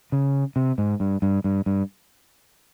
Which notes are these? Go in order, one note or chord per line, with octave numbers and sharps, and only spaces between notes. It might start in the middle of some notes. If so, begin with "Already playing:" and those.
C#3
C3
G#2
G2
G2
G2
G2